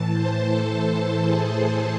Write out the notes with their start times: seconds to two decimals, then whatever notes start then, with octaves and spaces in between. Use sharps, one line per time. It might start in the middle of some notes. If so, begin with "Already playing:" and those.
Already playing: A2 E3 A5
0.11 C5
0.49 A4
1.24 G#4